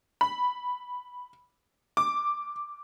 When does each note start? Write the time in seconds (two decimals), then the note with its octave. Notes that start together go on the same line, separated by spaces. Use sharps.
0.21 B5
1.97 D6